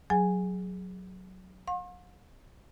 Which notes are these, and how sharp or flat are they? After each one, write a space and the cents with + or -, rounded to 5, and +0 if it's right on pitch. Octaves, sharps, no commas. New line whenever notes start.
F#3 +0 G#4 +0 G#5 -5
F5 +45 C6 +45